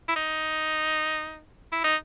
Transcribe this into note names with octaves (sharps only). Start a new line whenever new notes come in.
E4
D#4
E4
D#4